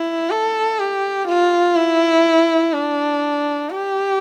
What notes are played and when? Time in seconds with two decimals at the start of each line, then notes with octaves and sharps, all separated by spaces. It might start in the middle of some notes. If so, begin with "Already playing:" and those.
Already playing: E4
0.30 A4
0.79 G4
1.28 F4
1.76 E4
2.73 D4
3.70 G4